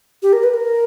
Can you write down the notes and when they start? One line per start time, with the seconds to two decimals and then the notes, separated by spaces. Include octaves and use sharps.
0.23 G4
0.33 A#4
0.43 B4
0.54 A#4